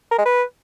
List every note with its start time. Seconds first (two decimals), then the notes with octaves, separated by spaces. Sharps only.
0.11 A#4
0.18 G#3
0.26 B4